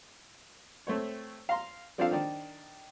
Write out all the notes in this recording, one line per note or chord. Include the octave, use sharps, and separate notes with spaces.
A3 C4 C#5
F5 A#5 C6
F3 C4 D4 F4 A4 F5
D#3 D4